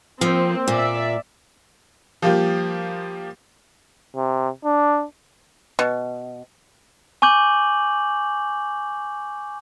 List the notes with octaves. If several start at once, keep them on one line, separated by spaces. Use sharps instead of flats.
F3 A#3 C4
A#2 D5 E5
F3 G3 A#3 F4 G4
C3
D4
B2
G#5 C#6 D6 G6 F#7